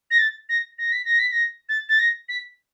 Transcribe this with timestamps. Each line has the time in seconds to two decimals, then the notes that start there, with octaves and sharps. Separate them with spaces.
0.11 A#6
0.19 A6
0.49 A#6
0.78 A#6
0.92 B6
1.05 A#6
1.19 B6
1.32 A#6
1.69 A6
1.89 A6
1.99 A#6
2.29 B6